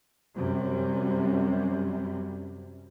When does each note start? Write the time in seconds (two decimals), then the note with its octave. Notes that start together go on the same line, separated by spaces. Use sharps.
0.36 F#2 C3 G3